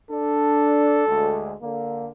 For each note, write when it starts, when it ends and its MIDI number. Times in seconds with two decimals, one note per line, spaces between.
0.11 1.02 62
0.11 1.55 69
1.08 1.55 38
1.08 1.55 56
1.62 2.08 50
1.62 2.08 58